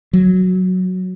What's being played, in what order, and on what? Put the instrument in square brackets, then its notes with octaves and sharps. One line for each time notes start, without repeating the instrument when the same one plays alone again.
[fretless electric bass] F#3